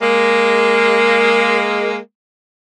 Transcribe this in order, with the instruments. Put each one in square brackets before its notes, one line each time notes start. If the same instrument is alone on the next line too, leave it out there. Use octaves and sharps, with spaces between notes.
[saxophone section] G#3 A#3